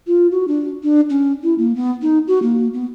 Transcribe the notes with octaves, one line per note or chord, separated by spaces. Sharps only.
F4
F#4
D4
D4
C#4
E4
A#3
B3
D#4
F#4
A#3
B3